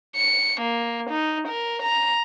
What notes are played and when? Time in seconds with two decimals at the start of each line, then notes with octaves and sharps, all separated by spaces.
0.16 C#7
0.61 A#3
1.10 D#4
1.48 A#4
1.82 A#5